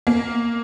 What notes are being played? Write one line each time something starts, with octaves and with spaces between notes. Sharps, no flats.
A#3